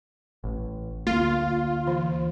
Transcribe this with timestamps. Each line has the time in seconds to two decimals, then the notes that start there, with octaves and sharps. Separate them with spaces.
0.44 A1
1.07 D2 A#3 F4
1.87 E3